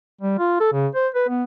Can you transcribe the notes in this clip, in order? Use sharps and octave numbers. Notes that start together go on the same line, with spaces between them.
G3
F4
A4
C#3
C5
B4
B3